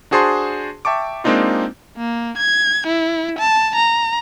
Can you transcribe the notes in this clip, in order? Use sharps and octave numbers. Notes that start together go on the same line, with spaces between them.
D4 F#4 G#4 C5 A5 C6
E5 G5 A5 C#6 D6
G#3 A#3 C4 D4 D#4 F4
A#3
G#6
E4
A5
A#5